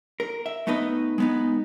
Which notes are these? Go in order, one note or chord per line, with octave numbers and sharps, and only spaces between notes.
A#4
E5
A3 B3 D#4 B4 D#5
G#3 B3 D#4